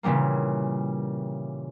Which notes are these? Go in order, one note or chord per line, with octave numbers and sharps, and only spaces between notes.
A#2 C#3 E3 G3 A#3